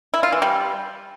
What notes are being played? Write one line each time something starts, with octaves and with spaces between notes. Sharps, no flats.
E4
F4
E3
G3